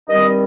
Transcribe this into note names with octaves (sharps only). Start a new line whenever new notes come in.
G2 D#3 G3 C4 D#5